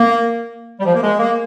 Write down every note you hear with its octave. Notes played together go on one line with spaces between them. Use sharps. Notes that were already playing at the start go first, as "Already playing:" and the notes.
Already playing: A#3
G3
F3
A#3
G#3
A#3